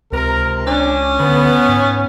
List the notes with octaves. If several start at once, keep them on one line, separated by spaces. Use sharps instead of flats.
C#2 C3 A#4
C#4 D4
D3 B3
G#2